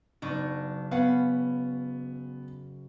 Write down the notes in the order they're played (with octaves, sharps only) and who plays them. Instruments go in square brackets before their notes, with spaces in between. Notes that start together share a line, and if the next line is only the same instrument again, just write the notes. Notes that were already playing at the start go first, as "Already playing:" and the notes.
[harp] F#1 C#6 [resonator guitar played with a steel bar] B3 D4 D#4
[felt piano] B3 [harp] C#4 B5 [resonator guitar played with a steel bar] F5 F#5